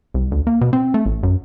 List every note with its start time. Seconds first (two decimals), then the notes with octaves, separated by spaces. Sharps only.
0.14 C2
0.32 D2
0.47 A#3
0.61 B2
0.73 C4
0.94 A3
1.06 A1
1.23 F#2